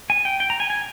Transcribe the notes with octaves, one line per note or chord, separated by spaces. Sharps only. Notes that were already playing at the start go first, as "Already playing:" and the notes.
G#5
G5
G5
A#5
G#5
G#5